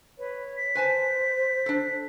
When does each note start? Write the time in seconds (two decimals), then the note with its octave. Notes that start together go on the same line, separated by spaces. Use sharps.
0.18 B4 C#5
0.57 B6
0.75 B4 C5 G#5 A5
1.66 D4 A4